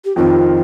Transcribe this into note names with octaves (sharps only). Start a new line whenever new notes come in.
G4
F2 D#3 C4 F4